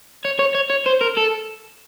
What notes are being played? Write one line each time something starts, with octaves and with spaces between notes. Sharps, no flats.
C#5
C#5
C#5
C#5
C5
A#4
A4